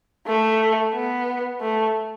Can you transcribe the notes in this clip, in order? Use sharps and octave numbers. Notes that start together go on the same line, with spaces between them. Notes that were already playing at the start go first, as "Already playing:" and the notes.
A3
B3
A3